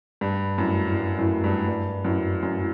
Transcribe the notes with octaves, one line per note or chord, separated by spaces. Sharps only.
G2
F#2 A2
A2
G2
F#2 A2
G2
G2
F#2 A2
F#2
A2